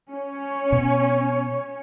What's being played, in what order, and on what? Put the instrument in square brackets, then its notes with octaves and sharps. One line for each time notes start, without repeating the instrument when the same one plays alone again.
[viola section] C#4 C#5
[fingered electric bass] B2